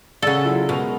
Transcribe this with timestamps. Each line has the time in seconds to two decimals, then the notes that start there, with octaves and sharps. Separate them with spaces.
0.22 C#3 G#4 A4 D5 F5 F#5
0.44 F#3 E4 F4
0.69 B2 G#3 A#4 F7